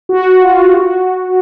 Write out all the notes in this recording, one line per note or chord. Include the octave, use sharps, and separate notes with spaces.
F#4
F4
G4
F#4